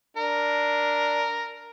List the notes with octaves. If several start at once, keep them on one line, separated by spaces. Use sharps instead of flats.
D4 A#4